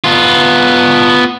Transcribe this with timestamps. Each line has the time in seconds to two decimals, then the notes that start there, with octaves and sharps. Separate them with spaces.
0.04 B3 F4